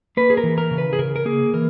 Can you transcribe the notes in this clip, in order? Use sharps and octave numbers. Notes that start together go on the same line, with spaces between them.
A#3 B4
G#4
A#4
E3
A#4
C#3
B4
G#4
C#3 A#4
A#4
A#3 G#4
E3 A#4